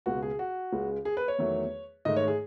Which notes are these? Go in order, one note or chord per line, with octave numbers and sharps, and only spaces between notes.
C#2 B2 G#3 F#4
G#4
F#4
C#2 C#3 G#3
G#4
B4
C#5
E2 D#3 F#3 A3
G#2 D#3 A3 D#5
C#5
G#4